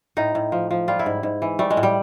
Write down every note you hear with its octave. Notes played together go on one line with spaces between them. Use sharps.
A2 D#4
A2
F3
F3
G3 F4
E4
G#2
G#2
E3
G3 A3
G#3
A2
G3